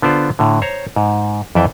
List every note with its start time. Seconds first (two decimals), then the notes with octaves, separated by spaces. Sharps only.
0.02 D3 B3 F4 C5 D5
0.39 A2 D3
0.62 C5 C#5 A#5
0.96 G#2
1.55 F2 E3 D5 E5 G5